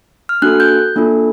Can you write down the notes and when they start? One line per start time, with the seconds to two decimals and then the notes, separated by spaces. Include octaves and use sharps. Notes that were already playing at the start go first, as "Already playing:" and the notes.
0.29 F6
0.42 A#3 D4 F#4 A4 F#6
0.60 G6
0.96 A#3 D4 F4 A4